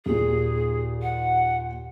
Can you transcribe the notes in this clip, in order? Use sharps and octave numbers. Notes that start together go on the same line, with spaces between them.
D#2 A#2 G#4
F#5